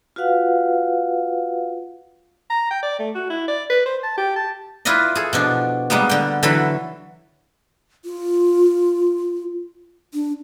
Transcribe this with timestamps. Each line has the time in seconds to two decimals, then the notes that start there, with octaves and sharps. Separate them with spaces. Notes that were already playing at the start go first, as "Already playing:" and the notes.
0.16 F4 F#4 B4 F5 F#5
2.50 A#5
2.71 G5
2.83 D5
3.00 A3
3.15 F#4
3.30 E4
3.48 D5
3.70 B4
3.86 C5
4.03 A5
4.17 G4
4.36 A5
4.85 E4 F4 B4 D5 D#5
5.15 G#4 A4
5.33 B2 F3 D4
5.90 G3 G#3 A#3 B3
6.09 D3 G5
6.43 D3 E3 F#3 A4 B5
8.05 F4
10.14 D4